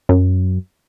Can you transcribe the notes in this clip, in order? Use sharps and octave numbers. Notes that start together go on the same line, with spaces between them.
F#2